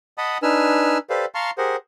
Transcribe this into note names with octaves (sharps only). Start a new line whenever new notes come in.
D#5 F#5 A5 B5 D#6
D4 D#4 B4 G#5 E6 F6
G4 A4 B4 C5 D5 F5
F5 A5 A#5 C6 C#6 F6
G4 G#4 A#4 C5 F#5